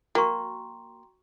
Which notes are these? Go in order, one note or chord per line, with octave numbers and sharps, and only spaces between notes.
A#3 F#4 G5 A#5 C6 C#6